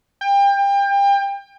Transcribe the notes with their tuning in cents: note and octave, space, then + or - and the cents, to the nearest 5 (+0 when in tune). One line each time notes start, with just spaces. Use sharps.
G5 +30